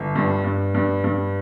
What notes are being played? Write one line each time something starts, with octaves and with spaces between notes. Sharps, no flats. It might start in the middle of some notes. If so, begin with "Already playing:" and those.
Already playing: G1
G2
G2
G2
G2